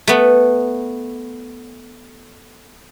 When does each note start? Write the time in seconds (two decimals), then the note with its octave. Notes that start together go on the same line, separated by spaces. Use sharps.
0.07 A3 B3